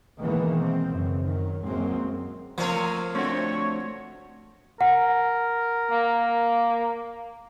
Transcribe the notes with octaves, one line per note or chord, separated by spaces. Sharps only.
B2 D#3 E3 G#3 A#3 B3
C4
F#2 C#3
D#3 F#3
F#2 F#3 G#3 A#3 C4
F3 A3 C4 A#4 C#5
A3 C4 D4 F#4 C#5
A#4 F#5
A#3